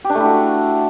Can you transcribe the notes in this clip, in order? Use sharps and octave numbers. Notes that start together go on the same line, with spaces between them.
G4
D4
A3
E4
F#4